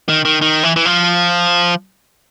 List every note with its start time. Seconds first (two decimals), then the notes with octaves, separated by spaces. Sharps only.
0.09 D#3
0.25 D#3
0.42 D#3
0.63 E3
0.76 E3
0.85 F3